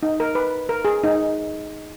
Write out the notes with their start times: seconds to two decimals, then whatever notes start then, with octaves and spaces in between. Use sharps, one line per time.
0.03 D#4
0.20 A#4
0.35 B4
0.69 A#4
0.85 G#4
1.04 D#4